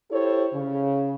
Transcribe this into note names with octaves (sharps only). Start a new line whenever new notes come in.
E4 G4 A4 C5 C#5
C#3